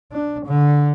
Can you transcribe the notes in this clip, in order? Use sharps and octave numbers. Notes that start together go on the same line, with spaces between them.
D4
D3